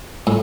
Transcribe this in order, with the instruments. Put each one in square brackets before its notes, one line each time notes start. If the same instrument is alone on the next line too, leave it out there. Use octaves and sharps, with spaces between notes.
[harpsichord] A2